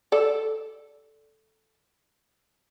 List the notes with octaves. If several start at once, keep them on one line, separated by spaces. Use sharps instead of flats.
A4 D5